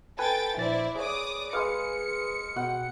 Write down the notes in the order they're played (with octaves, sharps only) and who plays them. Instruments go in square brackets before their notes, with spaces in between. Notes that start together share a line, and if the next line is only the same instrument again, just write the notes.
[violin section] A4 G5 A6 [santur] B4 [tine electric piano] G#5
[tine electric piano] A#1 A6 [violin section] E4 C5 D5
[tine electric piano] G#4 C#5 [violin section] D5 D6 D#6
[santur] G#3 G#4 F5 [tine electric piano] B4 [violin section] C#7
[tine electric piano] B2 [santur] F#5 G5